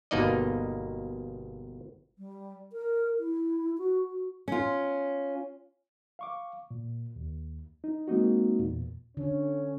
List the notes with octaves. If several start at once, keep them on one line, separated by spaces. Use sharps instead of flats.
G1 B2 A#3 D#4 D5 D#5
G3
A#4
E4
F#4
F#4
C#4 F4
F5 C#6 D6
A#2
D#2
D#4
G#3 A#3 C4 D#4 F#4
E2 A#2
D3 C#4